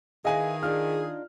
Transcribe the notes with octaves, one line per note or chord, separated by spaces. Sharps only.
D#3 E4 G#4 B4 D#5 F5 G#5
D4 D#4 F4 F6